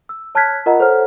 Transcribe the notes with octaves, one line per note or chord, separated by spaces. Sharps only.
E6
C#5 A5 F6 F#6 G#6 B6
F4 A#4 D#5 F#5 A#5 B5
A4 C5 C#5 F#5 A#5 F6